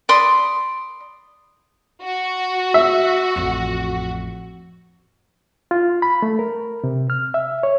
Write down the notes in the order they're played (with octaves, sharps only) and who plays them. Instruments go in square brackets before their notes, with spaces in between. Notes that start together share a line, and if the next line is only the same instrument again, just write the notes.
[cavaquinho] D5 B5 C6 D#6
[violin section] F#4
[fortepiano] E5
[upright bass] A1 F2
[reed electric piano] F4
B5
A3
A#4
C3
F6
E5
C#5